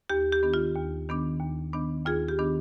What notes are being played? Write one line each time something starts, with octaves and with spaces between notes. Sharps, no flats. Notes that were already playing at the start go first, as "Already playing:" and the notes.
D#2 G4
G4
D#3 B3 D4
F4
D#2
D#3 B3 D4
D#2
D#3 B3 D4
D#2 F4 G#4
G4
D#3 B3 D4